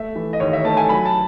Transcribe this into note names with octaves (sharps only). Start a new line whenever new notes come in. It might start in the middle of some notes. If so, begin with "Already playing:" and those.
Already playing: A3 E5
E3
D#5
D#2 C#5
E5
A3 A5
G#5
F#3 B5
A5